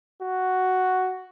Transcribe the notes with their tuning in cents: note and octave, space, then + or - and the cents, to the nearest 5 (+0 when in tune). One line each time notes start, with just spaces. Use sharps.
F#4 +5